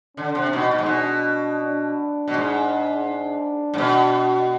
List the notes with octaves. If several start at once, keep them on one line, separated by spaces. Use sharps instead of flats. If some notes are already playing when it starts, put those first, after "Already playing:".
D3 D4
C3
B2 D#4
B2
G#2
B2 D4
D4
B2
G#2
D4
G#2
B2